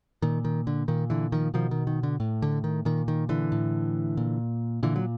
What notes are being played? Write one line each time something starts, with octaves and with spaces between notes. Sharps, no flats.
A#2 D#3
D#3
D3
A#2 D#3
D3 E3
D#3 F3
B2 D#3 F3
D#3
D#3
D3
A2
D3
D#3
A#2 D#3
D#3
D3 E3
A2
A#2
A#2 D3 E3
F#3